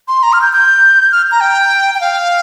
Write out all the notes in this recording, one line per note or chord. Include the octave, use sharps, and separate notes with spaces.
C6
A#5
F6
G6
G6
F6
A#5
G5
G5
F5